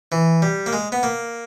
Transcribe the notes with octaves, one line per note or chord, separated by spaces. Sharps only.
E3
G3
A#3
G#3
B3
A#3